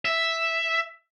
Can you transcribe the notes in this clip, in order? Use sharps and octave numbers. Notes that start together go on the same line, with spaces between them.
E5